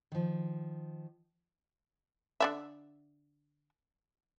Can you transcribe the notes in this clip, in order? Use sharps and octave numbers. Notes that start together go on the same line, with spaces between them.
D#3 F3
D3 D5 E5